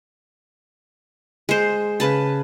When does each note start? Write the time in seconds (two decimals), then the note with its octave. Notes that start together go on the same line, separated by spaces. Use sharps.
1.49 G#3 C5
2.00 C#3 B4 A5